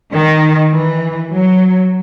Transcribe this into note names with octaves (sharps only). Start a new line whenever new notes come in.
D#3
E3
F#3